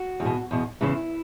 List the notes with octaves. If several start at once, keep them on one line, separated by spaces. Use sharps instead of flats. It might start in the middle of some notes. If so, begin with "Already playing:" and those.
Already playing: F#4
E2
B2
E2 B2
E2 C#3 E3 E4